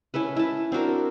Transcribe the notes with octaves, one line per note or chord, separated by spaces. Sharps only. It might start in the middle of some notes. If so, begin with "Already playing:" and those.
C#4 E4 A4 B4
E4 A5
C4 D4 F#4 A#4